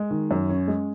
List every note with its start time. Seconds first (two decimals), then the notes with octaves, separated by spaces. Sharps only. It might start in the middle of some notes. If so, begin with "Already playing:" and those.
Already playing: G#3
0.10 D#3
0.31 F#2
0.49 C#4
0.68 G#3